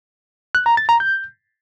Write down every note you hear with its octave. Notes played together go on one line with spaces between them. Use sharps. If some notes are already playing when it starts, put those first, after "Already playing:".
F#6
A#5
A6
A#5
G6